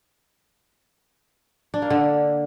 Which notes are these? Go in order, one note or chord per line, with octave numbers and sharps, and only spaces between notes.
D4
A#3
D3